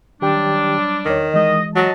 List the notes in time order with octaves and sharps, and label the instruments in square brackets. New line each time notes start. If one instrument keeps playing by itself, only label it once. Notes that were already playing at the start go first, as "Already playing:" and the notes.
[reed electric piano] D#3 G4 G5 [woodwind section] F#3 G3 D4
[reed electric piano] E2 C#5 [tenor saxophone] D#3
[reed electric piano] E3 G#3 [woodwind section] D#5
[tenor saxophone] F#3 [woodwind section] D#5 A5